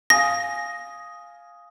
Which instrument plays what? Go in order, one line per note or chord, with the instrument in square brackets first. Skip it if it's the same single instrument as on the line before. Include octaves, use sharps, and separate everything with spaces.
[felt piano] F5 G#5 D#6 [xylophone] A#6